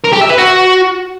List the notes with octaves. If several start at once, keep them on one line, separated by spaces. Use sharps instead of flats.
A#4
G4
E5
B4
F#4